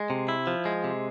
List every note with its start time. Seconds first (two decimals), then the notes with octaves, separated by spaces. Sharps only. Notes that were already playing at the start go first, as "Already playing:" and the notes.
Already playing: G#3
0.10 C3
0.28 E4
0.47 F3
0.65 G#3
0.84 C3